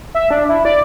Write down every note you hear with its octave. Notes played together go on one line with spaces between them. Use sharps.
E5
D4
E4
D5